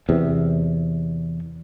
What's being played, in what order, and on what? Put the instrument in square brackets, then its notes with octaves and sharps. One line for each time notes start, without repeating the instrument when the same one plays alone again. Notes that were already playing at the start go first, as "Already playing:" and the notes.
[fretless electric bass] E2 C3